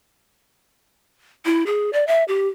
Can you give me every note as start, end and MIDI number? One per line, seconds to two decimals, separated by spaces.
1.45 1.64 64
1.67 1.91 68
1.93 2.05 74
2.07 2.24 76
2.28 2.48 67